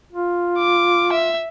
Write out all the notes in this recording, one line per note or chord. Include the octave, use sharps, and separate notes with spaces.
F4
D6
E5